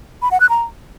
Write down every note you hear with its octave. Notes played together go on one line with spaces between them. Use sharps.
B5
F#5
F#6
A#5